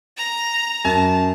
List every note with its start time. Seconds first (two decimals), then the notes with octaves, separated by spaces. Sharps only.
0.17 A#5
0.85 F#2 A5